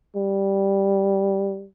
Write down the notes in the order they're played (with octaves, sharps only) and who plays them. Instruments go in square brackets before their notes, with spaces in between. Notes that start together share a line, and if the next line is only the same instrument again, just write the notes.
[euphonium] G3